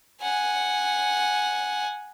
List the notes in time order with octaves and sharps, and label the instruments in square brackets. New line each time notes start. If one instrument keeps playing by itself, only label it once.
[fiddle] F#5 G#5